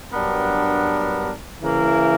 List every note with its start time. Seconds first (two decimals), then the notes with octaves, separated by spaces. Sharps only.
0.13 G2 F#3 B3 D4 A#4
1.62 C#3 E3 A#3 E4 A#4